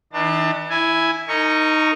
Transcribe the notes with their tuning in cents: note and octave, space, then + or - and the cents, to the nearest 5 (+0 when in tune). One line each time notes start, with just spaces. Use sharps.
E3 -35 D4 +30 A5 +35
E4 +0 G#5 +0
D#4 +0 A#4 -35 C#6 +5